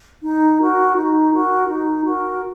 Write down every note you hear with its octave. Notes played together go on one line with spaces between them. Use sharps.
D#4
F#4 A#4
D#4
F#4 A#4
D#4
F#4 A#4